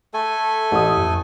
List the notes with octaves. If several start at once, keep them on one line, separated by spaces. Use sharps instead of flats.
A3 A4 G#5
A1 D#6
F2